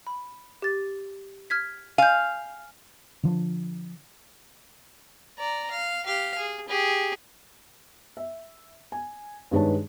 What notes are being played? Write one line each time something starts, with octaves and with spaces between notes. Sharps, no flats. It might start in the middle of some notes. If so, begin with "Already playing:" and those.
B5
G4 A6
F6 G#6 B6
F5 G#5 G6
D3 F3 D4
D5 A#5
F5
G4 F5
G#4
G4 G#4
E5
G#5
G2 D#3 G#3 B4 C#5 A5